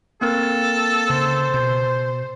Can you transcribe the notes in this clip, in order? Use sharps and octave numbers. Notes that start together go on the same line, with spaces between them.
A#3 C4 A4 A#4
C#3 C5
B2 G6